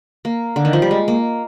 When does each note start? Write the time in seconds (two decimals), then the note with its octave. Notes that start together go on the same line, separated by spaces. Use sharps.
0.25 A#3
0.56 D3
0.65 D#3
0.73 F3
0.82 G3
0.91 G#3
1.08 A#3